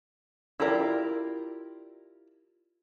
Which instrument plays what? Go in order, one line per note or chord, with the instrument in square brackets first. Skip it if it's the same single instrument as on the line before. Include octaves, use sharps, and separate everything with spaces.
[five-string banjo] E4 F4 G4 A#4 D5